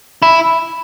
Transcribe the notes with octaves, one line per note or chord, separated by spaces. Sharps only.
E4